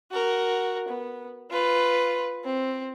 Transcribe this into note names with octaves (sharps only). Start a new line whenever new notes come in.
F#4 A#4
B3
F4 B4
C4